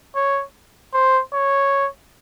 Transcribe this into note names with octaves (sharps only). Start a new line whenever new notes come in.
C#5
C5
C#5